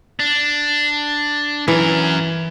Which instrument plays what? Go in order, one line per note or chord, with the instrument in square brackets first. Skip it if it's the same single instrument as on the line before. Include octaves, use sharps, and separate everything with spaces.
[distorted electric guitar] D4
[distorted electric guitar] F#2 A#4 [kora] E3